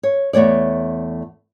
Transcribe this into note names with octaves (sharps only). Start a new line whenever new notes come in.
C#5
E2 A3 C#5 D5